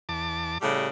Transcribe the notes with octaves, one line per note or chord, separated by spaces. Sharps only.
E2 A5 D6
A2 C#3 G3